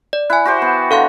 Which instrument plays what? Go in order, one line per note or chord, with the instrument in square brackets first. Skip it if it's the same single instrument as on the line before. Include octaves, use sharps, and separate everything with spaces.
[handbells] D5
[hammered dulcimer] E4 [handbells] G#5 F#6
[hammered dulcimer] F#4 G4 C5
B3
[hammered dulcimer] D3 [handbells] A4 F5 C6